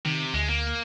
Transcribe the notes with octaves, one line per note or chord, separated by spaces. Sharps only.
C3 D#3
D2 G#3
A#3